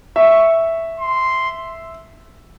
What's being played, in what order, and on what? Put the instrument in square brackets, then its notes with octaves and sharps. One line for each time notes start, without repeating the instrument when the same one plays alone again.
[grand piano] E5 [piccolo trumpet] C#6
[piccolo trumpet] C6